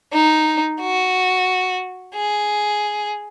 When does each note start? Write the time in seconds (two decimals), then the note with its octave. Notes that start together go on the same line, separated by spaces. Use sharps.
0.13 D#4
0.81 F#4
2.15 G#4